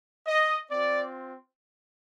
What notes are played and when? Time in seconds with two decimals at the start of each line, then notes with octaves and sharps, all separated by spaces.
0.26 D#5
0.71 C4 F4 D5